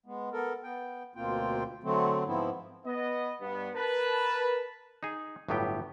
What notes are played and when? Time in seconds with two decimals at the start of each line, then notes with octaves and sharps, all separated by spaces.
0.06 G#3 B3
0.32 B3 A4 A#4
0.63 B3 G5
1.16 D2 B2 A#3 C4 F4 G5
1.84 D3 F#3 A3 C4
2.26 G#2 F3 B3 C4 E4
2.86 B3 D#5
3.40 G2 B3
3.75 A#4 B4 A5
5.03 D#4 G#4
5.48 G1 A2 F#3 B3 G4 G5